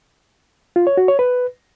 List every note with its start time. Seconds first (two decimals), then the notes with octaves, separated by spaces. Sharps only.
0.76 F4
0.87 C#5
0.97 F#4
1.08 C#5
1.19 B4